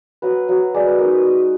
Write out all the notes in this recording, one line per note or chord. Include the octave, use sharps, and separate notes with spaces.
F#3 B4
F#3
G#3 D5
B4
D#4 A#4
B4
G#3 D#5